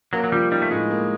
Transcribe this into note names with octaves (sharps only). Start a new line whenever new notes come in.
F#3 A#3
F#3
F3 G3
G3 D#4
A3
A2 G#3
A#3